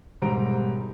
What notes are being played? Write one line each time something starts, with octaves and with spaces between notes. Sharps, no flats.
E1 G#2 G3 C5 A#5 D7